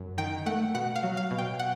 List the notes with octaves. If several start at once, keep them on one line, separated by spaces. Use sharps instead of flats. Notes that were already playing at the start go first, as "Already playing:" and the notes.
Already playing: F#2
D#3 G5
A3 F#5
B2 F#5
F5
F#3
F5
B2
G5
F#5